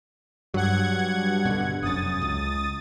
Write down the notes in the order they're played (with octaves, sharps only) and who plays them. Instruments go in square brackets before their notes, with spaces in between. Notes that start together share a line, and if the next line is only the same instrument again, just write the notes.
[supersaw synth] G2 F#5 G#6 [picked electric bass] F#3
[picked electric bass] B2 D3
[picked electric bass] F1 F#2 [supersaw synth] D#6 A6
[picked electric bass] C#2